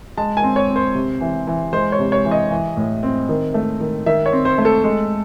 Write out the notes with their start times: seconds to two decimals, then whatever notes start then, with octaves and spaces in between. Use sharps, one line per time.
0.17 G#3 A5
0.37 G#5
0.43 C4
0.56 C#5
0.69 C4
0.76 C5
0.95 C3
1.21 E3
1.47 E3
1.73 G#3 C5
1.92 C#5
1.99 C3
2.12 C#5
2.25 E3
2.31 D#5
2.51 E3
2.77 A2
3.03 C4
3.29 D#3
3.54 A3
3.80 D#3
4.06 D#3 E5
4.26 C#5
4.33 C4
4.45 C5
4.58 A3
4.65 A4
4.84 G#3